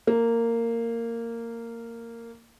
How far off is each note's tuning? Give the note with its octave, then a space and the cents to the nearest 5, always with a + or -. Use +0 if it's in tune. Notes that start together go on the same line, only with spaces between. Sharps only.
A#3 -15